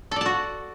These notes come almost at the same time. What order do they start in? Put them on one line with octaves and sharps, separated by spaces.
A4 D5 A5 F#4